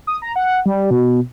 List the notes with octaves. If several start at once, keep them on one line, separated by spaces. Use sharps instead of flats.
D#6
A#5
F#5
G3
B2